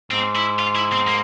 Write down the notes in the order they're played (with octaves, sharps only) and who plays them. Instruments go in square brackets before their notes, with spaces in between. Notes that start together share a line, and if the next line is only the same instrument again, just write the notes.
[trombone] G#2 [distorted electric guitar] C4
[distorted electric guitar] E4
F4
E4
C4
A#3